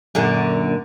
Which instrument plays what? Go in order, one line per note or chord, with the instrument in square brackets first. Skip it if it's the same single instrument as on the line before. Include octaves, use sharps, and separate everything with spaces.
[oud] F#2 A#2 D3